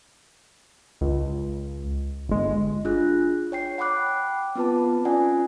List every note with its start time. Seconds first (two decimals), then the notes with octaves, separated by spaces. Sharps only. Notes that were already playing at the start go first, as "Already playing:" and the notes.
1.01 C#2
2.29 G1 G#3
2.85 D4 F4 G#4 F#6
3.52 C#5 G5 C7
3.78 F#5 G5 B5 D6 F#6
4.55 B3 C4 F4 B4 A5
5.05 C#4 F4 D5 F#5 G#5